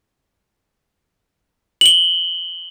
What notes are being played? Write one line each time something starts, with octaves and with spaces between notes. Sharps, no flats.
F#7 G7